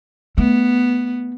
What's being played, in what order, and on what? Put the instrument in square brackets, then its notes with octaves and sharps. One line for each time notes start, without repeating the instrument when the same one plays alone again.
[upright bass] A3 [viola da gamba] B3